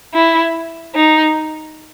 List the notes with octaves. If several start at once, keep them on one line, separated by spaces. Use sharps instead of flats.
E4
D#4